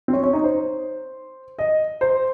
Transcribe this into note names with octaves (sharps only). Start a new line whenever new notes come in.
C4
C#4
C#4
D#4
C5
D#5
C5